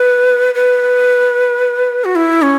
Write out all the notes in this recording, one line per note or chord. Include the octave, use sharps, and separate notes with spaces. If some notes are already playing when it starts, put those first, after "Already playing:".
Already playing: B4
B4
F#4
E4
C#4